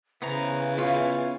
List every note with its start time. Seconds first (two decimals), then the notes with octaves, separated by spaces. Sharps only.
0.22 C#3 E3 B3 C5 A#5
0.78 B3 C#4 F4